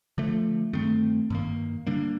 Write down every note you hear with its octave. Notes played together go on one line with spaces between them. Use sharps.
D3 F3 A3
G2 D#3 A3 C4
G2 D#3 A#3
D3 G3 A#3 D4